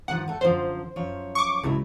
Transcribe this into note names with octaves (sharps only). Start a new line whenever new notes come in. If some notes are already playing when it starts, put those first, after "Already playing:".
G2 D#3 F3 F#5
A3 A4
F#2 D3 F3 C5
F#2 F3 C#5
C#6 D6
C#2 A2 F#3 E4